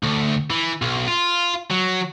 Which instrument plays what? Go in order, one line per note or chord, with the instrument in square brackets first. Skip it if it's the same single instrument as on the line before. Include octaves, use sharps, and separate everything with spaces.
[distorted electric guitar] D2
E3
B1
F4
F#3